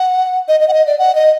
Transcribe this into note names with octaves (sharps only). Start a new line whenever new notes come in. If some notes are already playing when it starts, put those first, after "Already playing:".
Already playing: F#5
D#5
D#5
F#5
D#5
D5
F#5
D#5